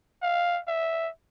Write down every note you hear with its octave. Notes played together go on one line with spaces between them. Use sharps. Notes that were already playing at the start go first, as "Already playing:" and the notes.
F5
E5